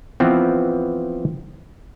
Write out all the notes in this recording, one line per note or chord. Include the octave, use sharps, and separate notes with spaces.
E3 F3 B3 C4